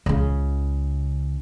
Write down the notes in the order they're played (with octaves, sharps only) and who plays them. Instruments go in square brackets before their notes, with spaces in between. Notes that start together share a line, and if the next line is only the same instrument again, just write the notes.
[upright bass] C#2 C#3